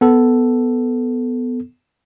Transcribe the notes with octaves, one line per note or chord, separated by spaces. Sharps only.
B3 A4